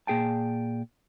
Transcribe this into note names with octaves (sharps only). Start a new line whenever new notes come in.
A#2 G#4 G5 A5